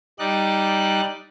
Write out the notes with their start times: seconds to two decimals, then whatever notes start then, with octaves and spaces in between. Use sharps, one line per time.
0.19 G3 D#4 D5 F#6